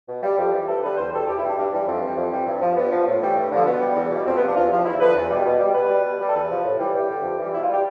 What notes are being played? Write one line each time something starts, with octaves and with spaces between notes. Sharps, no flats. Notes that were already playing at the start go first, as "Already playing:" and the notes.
B2
G3
F2 G4
E3 G3
G2 A4
D3 G3 B4
E2 C5
B2 G3 A4
E2 G4
E4
B2 G3 D4
G2
E3 G3
F2 C4
E3 G3
F2
E3 G3
G2
F3
G2 B3
F3
A2 A3
E3 G3
G2
D3 F3
B2 B3
G3
E2
B2 G3
F2 C4
B3
C3 F3 D4
E2 F4
C3 F3
E2 E4
D3 F3 B4
E2
B2 G3
B2
G3
B2 B4
G3
B2
G3
A4
E2 B4
C3 F3
A2
E3 G3
G2 G4
D3 G3
F2
E3 G3
B2 E4
F4
G3
G4